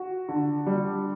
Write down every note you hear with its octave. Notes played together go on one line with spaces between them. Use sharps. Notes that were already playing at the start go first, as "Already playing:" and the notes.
Already playing: F#4
D3
G3